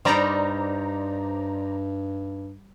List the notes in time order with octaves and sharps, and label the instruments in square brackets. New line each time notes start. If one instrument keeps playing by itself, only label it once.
[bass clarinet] G2 [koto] G3 D#4 [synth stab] C5 D5 A#5